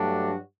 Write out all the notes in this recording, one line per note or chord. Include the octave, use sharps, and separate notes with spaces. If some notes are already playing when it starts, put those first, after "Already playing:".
Already playing: G2 F#3 A3 D4 F#4